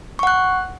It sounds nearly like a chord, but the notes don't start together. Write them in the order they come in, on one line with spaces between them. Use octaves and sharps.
C#6 F#5 F#6